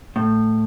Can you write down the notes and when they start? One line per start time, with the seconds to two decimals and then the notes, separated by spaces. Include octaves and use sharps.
0.16 A2